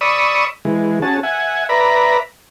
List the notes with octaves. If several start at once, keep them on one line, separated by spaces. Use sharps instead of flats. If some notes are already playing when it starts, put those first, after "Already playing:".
D5 B5 C#6 D#6 E6
E3 G#3
C#4 F#4 G#4 A5
E5 F#5 G#5
B4 D5 E5 A#5 B5